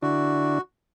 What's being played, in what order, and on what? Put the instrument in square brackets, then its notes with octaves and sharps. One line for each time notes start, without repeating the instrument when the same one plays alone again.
[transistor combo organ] D3 D4 E4 [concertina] F#4